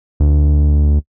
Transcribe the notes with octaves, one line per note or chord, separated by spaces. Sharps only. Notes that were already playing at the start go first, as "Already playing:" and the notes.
D2